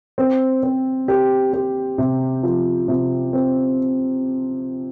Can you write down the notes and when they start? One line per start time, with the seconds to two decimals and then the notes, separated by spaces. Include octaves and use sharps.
0.18 C4
0.63 C4
1.08 G4
1.53 G4
1.98 C3
2.43 F3
2.88 C3
3.33 C4